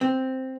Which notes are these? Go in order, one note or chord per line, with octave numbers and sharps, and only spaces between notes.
C4